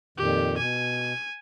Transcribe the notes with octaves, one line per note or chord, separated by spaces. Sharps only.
F2 A#2 D#3 G4
B2 G#5